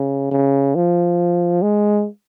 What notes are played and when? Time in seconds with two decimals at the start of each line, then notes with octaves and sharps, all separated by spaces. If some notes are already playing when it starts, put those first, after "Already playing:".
Already playing: C#3
0.31 C#3
0.75 F3
1.62 G#3